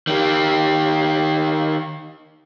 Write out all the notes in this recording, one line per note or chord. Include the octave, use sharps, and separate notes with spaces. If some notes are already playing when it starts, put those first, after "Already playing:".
D#3 G4